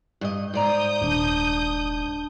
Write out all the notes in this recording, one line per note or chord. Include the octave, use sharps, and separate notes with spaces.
G2 D#5
G#2 D5 A#5 D#6 G6
D#1 D4 D#5 A5